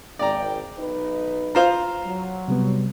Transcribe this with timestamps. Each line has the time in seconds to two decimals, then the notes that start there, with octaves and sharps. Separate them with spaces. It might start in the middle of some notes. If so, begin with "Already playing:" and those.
0.19 G#1 D5 G5 A#5
0.78 B1 D#4 B4
1.55 F4 C5 F5 A#5
2.05 F#3
2.48 C3 G3 B3